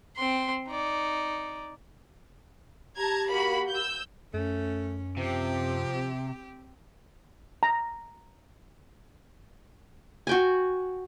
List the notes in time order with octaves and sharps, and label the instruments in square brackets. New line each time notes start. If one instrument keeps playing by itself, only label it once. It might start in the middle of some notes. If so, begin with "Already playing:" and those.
[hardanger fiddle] C4 C6
D#4 D5
[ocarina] G4 [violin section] A5 A#5 G#6
[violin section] A#3 F#4 B5
E6 G6
[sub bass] F#2 [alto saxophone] A3 [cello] C#4
[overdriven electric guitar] C3 [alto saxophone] F3 [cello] C4 G4
[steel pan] A#5
[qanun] F#4 G5 G#5